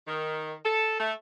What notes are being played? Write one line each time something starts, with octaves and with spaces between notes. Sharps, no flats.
D#3
A4
A3